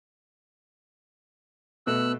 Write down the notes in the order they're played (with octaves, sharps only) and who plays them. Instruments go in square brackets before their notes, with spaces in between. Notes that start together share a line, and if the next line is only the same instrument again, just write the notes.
[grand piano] B2 A3 [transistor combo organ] B3 [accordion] E6 F#6